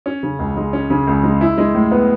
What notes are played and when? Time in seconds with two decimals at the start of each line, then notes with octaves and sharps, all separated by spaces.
0.06 C#4
0.23 C#3
0.39 C#2
0.57 G#3
0.73 C#4
0.90 C#3
1.07 C#2
1.24 G#3
1.41 E4
1.58 G#3
1.75 A2
1.91 B3